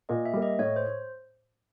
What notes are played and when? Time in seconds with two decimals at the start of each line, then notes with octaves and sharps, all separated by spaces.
0.09 A#2 D#5
0.25 E5
0.33 G3 A#3
0.42 D#5
0.59 A2 C#5
0.76 C5